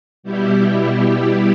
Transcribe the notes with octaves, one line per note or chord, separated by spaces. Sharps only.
B2 G3 E4 G4
B2 G3 E4 G4